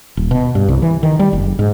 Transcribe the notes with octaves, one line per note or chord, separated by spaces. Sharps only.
D#1
B2
G2
C2
E3
D#3
G3
F#1
G#2